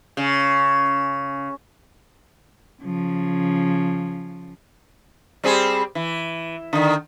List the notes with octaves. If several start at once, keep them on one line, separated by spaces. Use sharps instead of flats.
C#3
C#3 F3
G3 C4 G#4
E3
D3 D#3